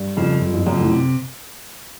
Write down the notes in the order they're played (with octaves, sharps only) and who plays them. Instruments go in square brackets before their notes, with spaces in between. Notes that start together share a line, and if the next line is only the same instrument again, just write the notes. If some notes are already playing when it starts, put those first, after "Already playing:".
Already playing: [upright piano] G2
[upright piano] F2 [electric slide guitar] C#3 F3
[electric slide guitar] F#2
[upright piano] F2
[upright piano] F#2 [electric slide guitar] C#3 F3
[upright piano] A2
[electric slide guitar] C3